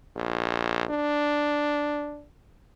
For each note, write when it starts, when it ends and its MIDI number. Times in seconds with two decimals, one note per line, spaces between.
0.16 0.84 34
0.90 2.23 62